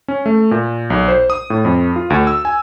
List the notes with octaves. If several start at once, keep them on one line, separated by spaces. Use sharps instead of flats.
C#4
A3
A#2
B1
C5
D#6
A2
F2
F4
D2
E6
G#5